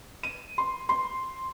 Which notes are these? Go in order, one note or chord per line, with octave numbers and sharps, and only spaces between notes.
D#7
C6
C6